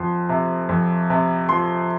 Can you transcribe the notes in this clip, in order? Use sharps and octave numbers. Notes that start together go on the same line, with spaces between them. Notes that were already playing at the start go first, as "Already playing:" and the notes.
Already playing: F2 F3 C6
C3
F2
C3
F3 C6